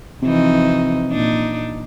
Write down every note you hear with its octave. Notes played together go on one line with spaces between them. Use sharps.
F2 C3 E3 D#4
A#2 D4 D#4